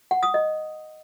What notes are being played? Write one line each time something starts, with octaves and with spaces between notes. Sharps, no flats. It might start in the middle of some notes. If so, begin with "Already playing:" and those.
F#5
D#6
D#5